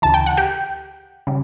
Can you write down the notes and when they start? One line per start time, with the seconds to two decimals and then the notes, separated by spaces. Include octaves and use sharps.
0.02 D2 C#3 E3 A5
0.14 G5
0.26 F#5
0.37 G4 G5
1.27 C#3 G3